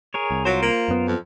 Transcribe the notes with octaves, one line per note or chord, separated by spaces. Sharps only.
G#4 A#4 C#5
C2
F#3 F4 A#4 C5
A#3
F#2 B3
F2